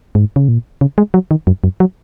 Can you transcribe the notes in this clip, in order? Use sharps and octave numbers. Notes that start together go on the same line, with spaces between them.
G#2
C#3
A#2
C#3
G#3
F#3
D#3
F#2
F#2
F#3